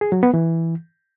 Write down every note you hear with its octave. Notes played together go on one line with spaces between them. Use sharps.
G#4
F#3
B3
E3